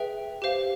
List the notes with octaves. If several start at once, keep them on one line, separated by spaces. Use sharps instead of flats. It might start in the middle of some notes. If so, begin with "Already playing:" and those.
Already playing: G#4 B4 E5 G5
G4 C5 F5